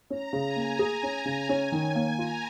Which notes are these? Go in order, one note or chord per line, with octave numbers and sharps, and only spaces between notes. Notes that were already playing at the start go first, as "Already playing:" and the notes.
C#4 A#5
C#3
G#5
A#3
G#4 G#5
C#4
C#3
C#4 G#5
D#3
A#3
F4 A#5